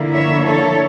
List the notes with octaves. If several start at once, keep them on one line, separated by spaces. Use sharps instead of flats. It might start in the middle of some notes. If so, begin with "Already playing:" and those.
Already playing: D3 F3 A#3 E4
C#5 E5
A4 C#5